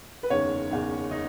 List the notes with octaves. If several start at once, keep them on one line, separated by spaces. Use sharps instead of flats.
B4
F#1 E2 D#3 C#5
F#1 E2 D#3
D#3 D#4